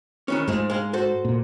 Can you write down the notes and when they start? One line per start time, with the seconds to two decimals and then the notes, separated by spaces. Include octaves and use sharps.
0.28 D#3 E3 C#4
0.48 G#2 F3 G#3 A3
0.70 G#3 F5
0.93 F#4 A4 C5
1.25 A#2